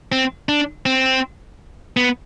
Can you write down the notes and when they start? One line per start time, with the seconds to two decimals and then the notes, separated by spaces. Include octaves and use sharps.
0.12 C4
0.49 D4
0.86 C4
1.97 B3